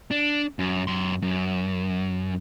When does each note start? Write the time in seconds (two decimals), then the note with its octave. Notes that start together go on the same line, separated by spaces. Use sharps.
0.11 D4
0.59 F#2
0.87 F#2 C6
1.22 F#2